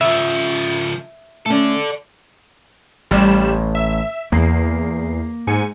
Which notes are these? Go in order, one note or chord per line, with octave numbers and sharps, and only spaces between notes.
C#3 F3 E5
A3 C#4 A4 D5
A1 G3 E7
E5
E2 A#3 C7
G#2 G#5 C#7